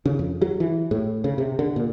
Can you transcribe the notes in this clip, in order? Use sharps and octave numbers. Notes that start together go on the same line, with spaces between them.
C#3
F2
F#3
E3
A2
C#3
C3
D3
A#2